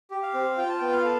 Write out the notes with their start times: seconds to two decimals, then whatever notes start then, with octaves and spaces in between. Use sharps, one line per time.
0.11 G4
0.23 F5
0.34 C4
0.57 F4 G5
0.69 A5
0.79 B3 G5
0.93 F5
1.04 A4